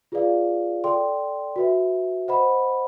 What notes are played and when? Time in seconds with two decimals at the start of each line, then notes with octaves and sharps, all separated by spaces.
0.12 F4 G#4 B4 D5 F5
0.84 A4 D5 G5 C6
1.56 F#4 B4 E5
2.28 C5 D#5 F#5 B5